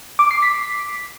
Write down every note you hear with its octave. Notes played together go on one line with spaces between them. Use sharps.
D6
C7
B6